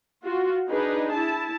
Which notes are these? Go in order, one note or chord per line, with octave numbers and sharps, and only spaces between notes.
F4 F#4
D4 D#4 G#4 B4
E4 A5